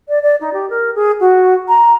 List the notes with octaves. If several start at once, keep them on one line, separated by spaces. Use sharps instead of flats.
D5
D5
D#4
G4
A#4
G#4
F#4
A#5